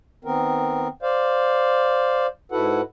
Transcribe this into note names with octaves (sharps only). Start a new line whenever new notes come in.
D#3 B3 C4 A#4
C5 D5 F5
G#2 E4 F#4 A4 B4 F#5